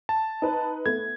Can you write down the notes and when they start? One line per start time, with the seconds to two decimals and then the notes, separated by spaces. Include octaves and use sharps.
0.09 A5
0.42 D#4 B4
0.86 A3 B3 G#6